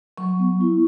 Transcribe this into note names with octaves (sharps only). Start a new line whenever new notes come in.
F#3 C#6
B3
E4